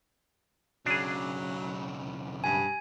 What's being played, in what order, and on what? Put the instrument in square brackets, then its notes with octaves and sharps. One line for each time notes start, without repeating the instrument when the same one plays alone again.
[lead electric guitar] B1 C#3 [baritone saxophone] F#3 [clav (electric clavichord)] D4 G#4
[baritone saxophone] G2 [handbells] G#5